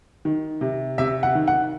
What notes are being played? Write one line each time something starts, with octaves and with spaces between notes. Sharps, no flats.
D#3
C3
C3 E5
F#5
D#3
F#5